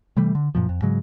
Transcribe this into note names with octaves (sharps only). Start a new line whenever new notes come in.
C3 E3 G3 A3
D3
F#2 A#2 F3
F2
G#2 C#3 F#3 G#3